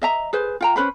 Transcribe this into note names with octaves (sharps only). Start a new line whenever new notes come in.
D#5 E5 A#5
G#4 B4 C5
F4 G5 A#5
C#4 B4 C5 B5